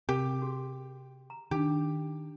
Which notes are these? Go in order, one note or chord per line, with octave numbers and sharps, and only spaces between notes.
C3 G4 A#4
F#4 G#4
A#5
D#3 D4 G4 A5